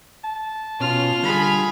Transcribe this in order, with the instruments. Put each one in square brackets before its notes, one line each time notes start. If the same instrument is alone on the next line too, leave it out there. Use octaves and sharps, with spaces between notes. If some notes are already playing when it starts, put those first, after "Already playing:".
[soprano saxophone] A5
[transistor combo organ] B2 C#4 [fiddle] F4 F6
[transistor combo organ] D3 G3 [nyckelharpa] G#4 B5